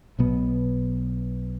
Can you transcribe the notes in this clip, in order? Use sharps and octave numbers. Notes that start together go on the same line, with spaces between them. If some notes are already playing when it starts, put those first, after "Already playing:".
B1 B2 B3